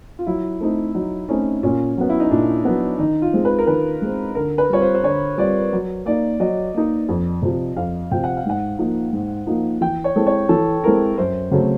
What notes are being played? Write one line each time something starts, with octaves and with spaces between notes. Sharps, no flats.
F4
F#3 E4
A3 C4 D#4
F#3 D#4
A3 C4 C#4 D#4
A#2 C#4
F#3 B3
E4
D#4
A#2 D4
F#3 B3
D#3 D#4
F4
G#3 C4
B4
A#4
D#3 B4
G#3 C4
D3 A#4
B4
G3 C4 F4 C#5
C5
C5
D3 C#5
G3 C4 F4 D5
F#3
A#3 D#4 D5
F#3 D#5
A#3 D#4
F2
C3 F3
F2 F5
C3 F3 G5
F#5
F5
G#2 F#5
F3 A#3 D#4
G#2
F3 A#3 D#4
E3 G5
C#5
G#3 C4 E4 A4
C#5
E3 A4
G#3 C4 E4 A4 A#4
F#2 C5
C#3 F#3 A3 C4